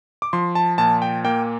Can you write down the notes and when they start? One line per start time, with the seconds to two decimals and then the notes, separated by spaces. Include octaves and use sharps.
0.22 D6
0.33 F3 C6
0.55 A5
0.78 A#2 A5
1.02 G5
1.25 A#3 G5